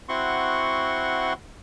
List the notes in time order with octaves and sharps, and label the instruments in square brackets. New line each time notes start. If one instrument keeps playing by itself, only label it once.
[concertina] C4 E4 F#4 F#5 C6 C#6